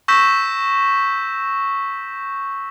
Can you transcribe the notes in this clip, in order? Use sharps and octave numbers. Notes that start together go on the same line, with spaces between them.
C#6 E6 G6 A#6 B6 E7